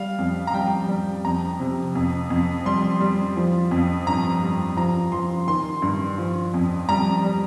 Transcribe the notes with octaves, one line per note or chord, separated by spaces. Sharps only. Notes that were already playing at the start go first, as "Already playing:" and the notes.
Already playing: G3 F5
F2
A#5
G3 G5
G3
F2 A#5
C3
F2
F2
G3 C6
G3
F3
F2
G2 A#5
G3
F3 A#5
F3 C6
D#3 C6
G2
F3
F2
G3 A#5
G3